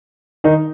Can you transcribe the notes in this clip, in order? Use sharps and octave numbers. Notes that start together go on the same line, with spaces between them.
D#3 D#4